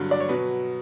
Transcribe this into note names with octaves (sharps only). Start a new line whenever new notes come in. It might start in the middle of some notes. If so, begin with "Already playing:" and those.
Already playing: G2 D3 F#3
D5
C#5
B2 F#3 B4